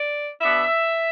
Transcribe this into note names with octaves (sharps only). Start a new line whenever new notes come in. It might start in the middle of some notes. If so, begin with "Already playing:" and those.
Already playing: D5
B2 B3 D4 E5